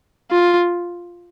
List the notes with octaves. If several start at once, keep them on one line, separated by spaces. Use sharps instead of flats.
F4